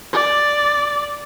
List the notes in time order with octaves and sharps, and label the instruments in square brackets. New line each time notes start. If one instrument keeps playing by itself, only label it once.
[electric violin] D5